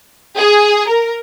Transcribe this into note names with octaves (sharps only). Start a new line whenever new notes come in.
G#4
A#4